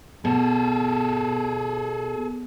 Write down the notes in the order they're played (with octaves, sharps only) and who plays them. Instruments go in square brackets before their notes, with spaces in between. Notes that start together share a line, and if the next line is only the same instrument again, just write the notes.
[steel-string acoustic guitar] B2 [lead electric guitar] G#4 A4